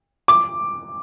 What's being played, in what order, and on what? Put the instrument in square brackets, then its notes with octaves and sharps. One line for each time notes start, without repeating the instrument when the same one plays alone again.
[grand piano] D6